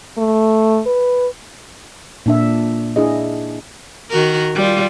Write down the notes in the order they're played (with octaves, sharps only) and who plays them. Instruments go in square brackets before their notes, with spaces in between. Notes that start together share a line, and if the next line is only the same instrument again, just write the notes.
[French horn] A3
B4
[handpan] A#2 D4 E5
D4 E4 G#4 D#5
[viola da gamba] D#3 F#4 A#4
G3 F4